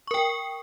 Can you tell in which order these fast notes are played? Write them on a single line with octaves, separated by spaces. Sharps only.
C#6 A#4 G5